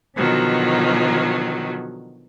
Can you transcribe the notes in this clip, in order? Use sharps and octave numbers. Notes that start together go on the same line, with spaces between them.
B2 D3 D#3 F3 F#3